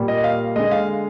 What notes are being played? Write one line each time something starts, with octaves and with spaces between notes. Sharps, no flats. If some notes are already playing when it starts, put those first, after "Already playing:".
Already playing: A#2 G3
D#5
F5
D3 G#3 D#5
F5